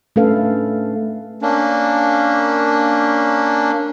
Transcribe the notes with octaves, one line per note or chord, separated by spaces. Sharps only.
A3 C#4 D4 A4 B4 F5
A#3 C#4 D4